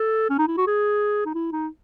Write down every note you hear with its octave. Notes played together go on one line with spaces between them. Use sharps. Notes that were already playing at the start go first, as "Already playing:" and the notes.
Already playing: A4
C#4
D#4
E4
F#4
G#4
D#4
E4
D#4